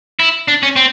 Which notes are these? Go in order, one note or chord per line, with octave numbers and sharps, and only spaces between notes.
E4
D4
C#4
C4